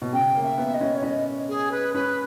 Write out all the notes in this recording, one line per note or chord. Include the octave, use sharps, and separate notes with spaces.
B2
C#3 G5
A#3
E5
B3
D#5
C#4
C#5
C#4 D#5
G#4
B4
C#4 B4